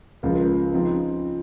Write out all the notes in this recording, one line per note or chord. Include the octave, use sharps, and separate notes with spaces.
C#2 C#3 F3 A#3
C#3 F3 C4 D#4